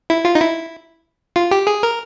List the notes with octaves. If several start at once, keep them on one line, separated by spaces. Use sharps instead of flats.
E4
F4
D#4
E4
F4
G4
G#4
A#4